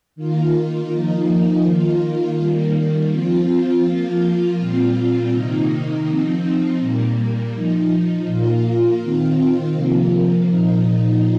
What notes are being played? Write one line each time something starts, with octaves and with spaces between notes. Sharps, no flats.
D#3 A#3 F4
F3 A#3 D#4
D#3 A#3 F4
D#3 G3 A#3
F3 C4 F4
F3 A#3 F4
A#2 G3 C4 F4
C3 D#3 A#3 D#4
F3 C4 D#4
A#2 G3 A#3
F3 D#4
A#2 A#3 F4
D#3 C4 F4
C3 F3 A#3
A#2 F3 D#4